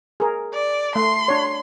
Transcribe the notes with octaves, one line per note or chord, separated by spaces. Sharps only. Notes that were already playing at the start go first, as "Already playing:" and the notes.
G#4 A#4
D5
A3 C6
D4 C#5